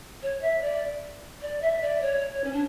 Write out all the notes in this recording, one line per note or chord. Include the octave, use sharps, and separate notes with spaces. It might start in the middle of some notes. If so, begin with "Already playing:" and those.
C#5
E5
D5
D5
E5
D5
C#5
C#4
D4